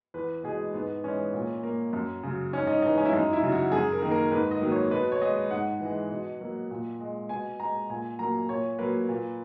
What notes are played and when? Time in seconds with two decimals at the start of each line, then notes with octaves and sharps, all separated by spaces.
0.14 E2 B4
0.44 B2 G#3 G#4
0.74 G#2 B3
1.04 E3 G#3 C#4
1.34 A#2
1.63 A#3
1.93 F#2
2.23 C#3 F#3
2.53 G#2 C#4
2.67 D#4
2.82 E3 G#3 D#4
2.98 C#4
3.05 E4
3.13 F#2 D#4
3.33 E4
3.42 C#3 F#3
3.52 F#4
3.72 F#2 G#4
3.92 A#4
4.02 D#3 A#3
4.12 A#4
4.32 G#2 B4
4.51 D#5
4.61 D#3 F#3 A#3
4.72 C#5
4.91 B2 B4
5.12 C#5
5.21 G#3 D#5
5.51 G#2 F#5
5.80 E3
5.85 G#3
6.11 B2
6.41 F#3 A#3
6.71 A#2
7.00 G#3
7.29 B2 G#5
7.60 G#3 A#5
7.89 A#2 G#5
8.19 F#3 A#3 A#5
8.49 A#2 C#5
8.78 F#3 A#3 B4
9.09 A#2